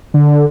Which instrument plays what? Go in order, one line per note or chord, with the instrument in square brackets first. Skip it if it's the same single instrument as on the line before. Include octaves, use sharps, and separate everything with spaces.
[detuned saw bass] D3